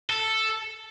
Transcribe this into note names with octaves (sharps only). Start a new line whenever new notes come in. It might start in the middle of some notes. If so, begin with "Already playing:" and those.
A4